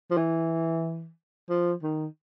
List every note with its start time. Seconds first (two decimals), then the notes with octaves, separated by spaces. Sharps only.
0.11 F3
0.17 E3
1.49 F3
1.83 D#3